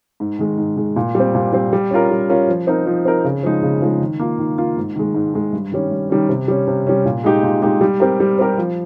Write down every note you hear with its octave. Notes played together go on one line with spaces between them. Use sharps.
G#2
D#3 G#3
G#2
D#3 G#3
A#2
G3 C4
A#2
G3 C4
G3
C#4 F4 A#4
G3
C#4 F4 A#4
F3
C4 D#4 A#4
F3
C4 D#4 A#4
C#3
F3 G#3 D#4
C#3
F3 G#3 D#4
D#3
A#3 F4
D#3
A#3 F4
G#2
D#3 G#3
G#2
D#3 G#3
G2
D#3 G3 C#4
G2
D#3 G3 C#4
C3
G3 C#4
C3
G3 C#4
A#2
G#3 D#4 G4
A#2
G#3 D#4 G4
G3
C4 G4 A#4
G3
C4 G4 A#4
F3